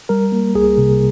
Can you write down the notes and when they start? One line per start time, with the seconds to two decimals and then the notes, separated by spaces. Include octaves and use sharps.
0.09 G3 A#4
0.32 A#3
0.55 C2 G#4
0.78 C3